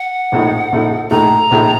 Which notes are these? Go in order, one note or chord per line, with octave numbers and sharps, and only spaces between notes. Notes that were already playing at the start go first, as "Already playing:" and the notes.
Already playing: F#5
A#1 A2 A3 D#4
A#1 A2 A3 D#4
A#1 A2 A3 D#4 A#5
A#1 A2 A3 D#4